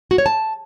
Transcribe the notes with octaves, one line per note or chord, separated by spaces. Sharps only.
F#4
C#5
A5